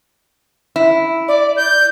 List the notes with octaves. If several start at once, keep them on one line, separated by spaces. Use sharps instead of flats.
E4
D5
G6